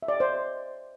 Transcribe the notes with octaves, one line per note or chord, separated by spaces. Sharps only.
E5
D5
D#5
C5